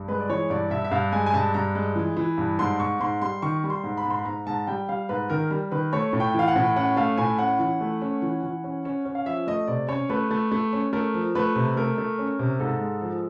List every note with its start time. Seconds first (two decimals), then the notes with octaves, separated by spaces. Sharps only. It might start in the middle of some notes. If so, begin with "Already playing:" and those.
Already playing: G2
0.08 G#3 B4
0.20 D5
0.30 E3 C#5
0.50 G2 D5
0.71 G2 E5
0.84 E5
0.91 G2 F5
1.12 G#3 G#5
1.26 G#5
1.34 G2 A5
1.54 G2 A#5
1.75 G#3
1.96 E3
2.17 E3
2.38 G2
2.59 G#2 C6
2.80 G#2 C#6
3.00 G#2 C6
3.22 G3 C6
3.42 D#3 C#6
3.64 G3
3.70 C6
3.84 G#2
3.97 B5
4.05 G#2
4.10 C6
4.19 B5
4.26 G#2 A#5
4.47 G#2 A5
4.67 G3 G5
4.89 G3 F5
5.09 G#2 B4
5.30 D#3 A#4
5.51 G3
5.71 D#3 B4
5.93 A3 C#5
6.13 A2
6.20 G5
6.34 E3 F5
6.48 F#5
6.56 A2
6.76 C#4 F#5
6.96 A3 F5
7.18 A2 G#5
7.39 C#4 F#5
7.59 E3
7.81 A3
8.02 C#4
8.22 E3
8.43 E3
8.64 C#4
8.85 C#4
9.05 C#4
9.15 F5
9.26 F3 E5
9.47 A3 D#5
9.67 C3 D5
9.88 C#4 C#5
10.09 A3 B4
10.30 A3
10.52 A3
10.73 C#4
10.93 A3 A#4
11.14 F3
11.35 A3 B4
11.56 C3
11.76 A3 A#4
11.98 A3
12.19 C#4
12.39 C3
12.60 G#2 A4
12.81 G#3
13.02 F3